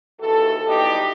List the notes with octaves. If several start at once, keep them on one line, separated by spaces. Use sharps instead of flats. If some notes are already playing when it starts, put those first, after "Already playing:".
D#2 E3 F#4 A4
F#3 G3 B3 D#4 E4 G4